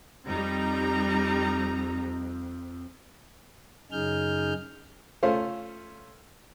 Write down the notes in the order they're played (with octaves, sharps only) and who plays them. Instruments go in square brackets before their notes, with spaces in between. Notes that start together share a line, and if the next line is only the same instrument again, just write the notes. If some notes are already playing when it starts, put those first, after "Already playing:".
[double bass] F2 C4 [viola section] G3 D#4 A#5
[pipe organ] F#2 C#3 D#4 G#4 F6 G6
[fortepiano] A3 C#4 F4 C5